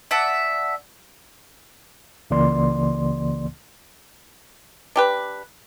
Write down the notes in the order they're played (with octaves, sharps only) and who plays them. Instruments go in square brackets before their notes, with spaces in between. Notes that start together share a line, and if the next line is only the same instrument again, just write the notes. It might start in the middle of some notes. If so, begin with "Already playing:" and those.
[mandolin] D5 E5 F#5 A5
[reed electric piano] C#2 C#3 E3 A#3 D5 C6
[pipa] D4 G4 B4